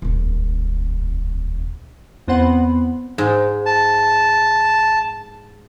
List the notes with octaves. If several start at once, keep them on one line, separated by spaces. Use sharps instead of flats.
D#1 C#2
E2 B3 C4 C5 F#5
G#2
A5